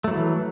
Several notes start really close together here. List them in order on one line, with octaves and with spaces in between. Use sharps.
A3 F#3 E3